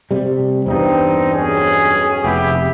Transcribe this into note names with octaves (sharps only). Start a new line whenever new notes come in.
C3 G3
E2 G2 C4 D#4
B1 C#4 G#4
F1 B3 E4 G4